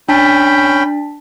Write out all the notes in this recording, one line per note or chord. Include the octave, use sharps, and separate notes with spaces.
C#4 D4 G5 A5 B5 B6